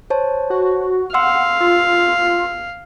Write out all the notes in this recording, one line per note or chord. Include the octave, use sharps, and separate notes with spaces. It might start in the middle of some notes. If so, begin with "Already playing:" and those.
C5 C#5 A5
F#4
F5 F#5 C6 E6
F4 E6